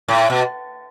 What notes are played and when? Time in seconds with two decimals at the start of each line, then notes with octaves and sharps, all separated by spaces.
0.08 A2
0.30 B2